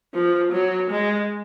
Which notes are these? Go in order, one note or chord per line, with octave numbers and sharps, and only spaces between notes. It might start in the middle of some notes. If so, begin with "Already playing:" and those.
F3
F#3
G#3